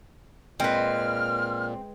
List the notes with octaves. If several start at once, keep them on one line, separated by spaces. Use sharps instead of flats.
A#2 G#3 C4 B4 F6